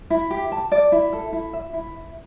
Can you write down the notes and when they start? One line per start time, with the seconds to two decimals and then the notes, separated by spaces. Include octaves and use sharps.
0.10 E4
0.31 G4
0.52 A5
0.72 D5
0.92 E4
1.13 A4
1.33 E4
1.53 E5
1.73 E4